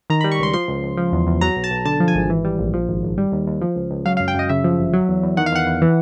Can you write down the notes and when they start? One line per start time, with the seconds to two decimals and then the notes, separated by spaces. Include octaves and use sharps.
0.10 D#3 A#5
0.21 G3 B5
0.32 C#6
0.39 C#2 C6
0.53 F3 C6
0.68 C#2
0.83 C#2
0.97 F3
1.12 E2
1.27 E2
1.41 F#3 A#5
1.57 B1
1.64 A5
1.71 B1
1.85 D3 A5
2.00 F3
2.08 G#5
2.15 G#1
2.30 E3
2.45 G3
2.59 A#1
2.74 F3
2.88 G#1
3.03 G#1
3.18 G3
3.32 D#2
3.47 D#2
3.61 F3
3.76 C#2
3.91 C#2
4.06 F#3 F5
4.17 F#2 F5
4.28 G5
4.35 F#2 D#5
4.49 C#3 E5
4.64 F3
4.79 G1
4.93 F#3
5.08 E2
5.23 E2
5.37 D#3 F#5
5.46 F5
5.52 E2 F#5
5.66 E2
5.82 E3